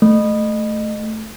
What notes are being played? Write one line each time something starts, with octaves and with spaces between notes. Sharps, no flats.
A3